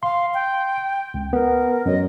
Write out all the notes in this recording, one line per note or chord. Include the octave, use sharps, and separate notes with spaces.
F5 C6
G5
C#2
B3 A#4
F#2 F#3 D#5